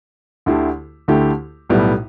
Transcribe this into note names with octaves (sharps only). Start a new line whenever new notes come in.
D2 D3 A3 E4 G4
D2 D3 A3 E4 G4
B1 A2 G3 B3 E4